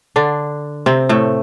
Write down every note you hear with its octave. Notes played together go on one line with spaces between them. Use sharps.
D3 D4
C3 C4
A2 A3